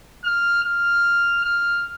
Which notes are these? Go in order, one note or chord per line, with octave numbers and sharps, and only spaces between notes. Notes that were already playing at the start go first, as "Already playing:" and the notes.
F6
F6
F6